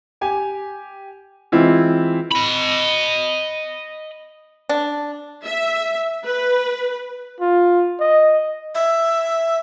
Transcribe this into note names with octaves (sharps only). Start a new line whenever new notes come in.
G4 G#5
E3 G#3 C4 E4 F4
D#5 B5
D4
E5
B4
F4
D#5
E5